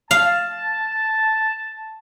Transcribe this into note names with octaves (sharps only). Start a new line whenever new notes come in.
F5 A5